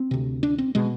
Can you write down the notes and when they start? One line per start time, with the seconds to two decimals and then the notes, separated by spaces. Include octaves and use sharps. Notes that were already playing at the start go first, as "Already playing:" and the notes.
Already playing: C4
0.11 D2 C3
0.43 D4
0.58 C4
0.75 B2 G#3